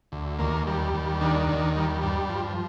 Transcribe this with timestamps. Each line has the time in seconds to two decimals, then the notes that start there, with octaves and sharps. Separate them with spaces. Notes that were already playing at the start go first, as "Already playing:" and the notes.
0.12 D2
0.39 D#2 A#3
0.67 G3
0.94 D#2
1.21 D#3 D4
1.49 D#2
1.76 G3
2.03 G2
2.29 F3